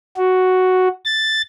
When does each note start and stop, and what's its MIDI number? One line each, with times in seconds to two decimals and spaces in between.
0.17 0.88 66
1.05 1.42 93